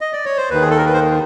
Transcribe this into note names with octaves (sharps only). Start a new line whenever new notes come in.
D#5
D5
C#5
C5
D#2 D#3 B4
G#4
A4
A#4
B4
C5